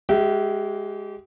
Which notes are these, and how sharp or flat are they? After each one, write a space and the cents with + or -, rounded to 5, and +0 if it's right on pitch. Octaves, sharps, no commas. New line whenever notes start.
G#3 +0 G4 -35 E5 -5